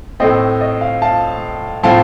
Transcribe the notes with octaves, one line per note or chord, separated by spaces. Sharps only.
A2 A3 C4 D#5 G5
D#5
F5
F5 A5
A2 F3 C4 F4 F5 A5